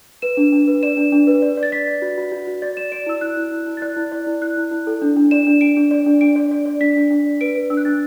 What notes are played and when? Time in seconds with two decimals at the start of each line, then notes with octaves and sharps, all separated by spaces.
0.22 B4 E7
0.37 D4
0.52 D4
0.67 B4
0.83 D5 E7
0.97 D4
1.12 D4
1.27 B4
1.42 D5
1.57 D5
1.63 A6
1.72 D5 B6
1.87 D5
2.02 F#4
2.18 F#4
2.32 F#4
2.47 F#4
2.62 D5 A6
2.77 D5 E7
2.92 D5 D7
3.06 E4 E6
3.21 E4 F#6
3.37 E4
3.52 E4
3.67 E4
3.77 A6
3.82 D5 F#6
3.96 E4
4.12 D5
4.27 E4
4.42 E4 F#6
4.57 E4
4.71 E4
4.87 A4
5.02 D4
5.16 D4
5.31 D5 E7
5.47 D4
5.61 D4 D7
5.77 D4
5.91 D5
6.06 D4
6.21 D4 D7
6.36 D5
6.51 D5
6.66 D5
6.81 D4 B6
6.96 D4
7.11 D4
7.26 D5
7.41 B4 D7
7.55 B4
7.70 D4 E6
7.77 F#6
7.85 D4 A6